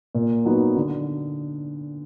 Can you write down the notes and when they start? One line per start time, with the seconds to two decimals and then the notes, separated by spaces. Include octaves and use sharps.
0.15 A#2
0.45 F#3 B3 D#4
0.76 D3